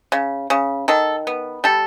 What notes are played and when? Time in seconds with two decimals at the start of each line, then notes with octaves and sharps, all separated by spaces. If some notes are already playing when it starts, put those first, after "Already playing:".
0.12 C#3
0.50 C#3
0.88 D#3 A4
1.27 B3
1.64 G3 A4